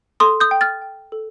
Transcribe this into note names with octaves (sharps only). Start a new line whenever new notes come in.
A4 C6 D#6
D#6 G6
G5
F6 A6
G5
A4